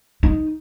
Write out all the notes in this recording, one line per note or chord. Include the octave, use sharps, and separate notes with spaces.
D#4